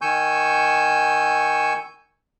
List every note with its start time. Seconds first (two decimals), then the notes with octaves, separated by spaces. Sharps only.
0.02 D#3 G#5 C#6 E6 G6